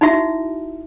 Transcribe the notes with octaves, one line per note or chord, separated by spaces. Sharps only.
D#4 E4 F#4 E5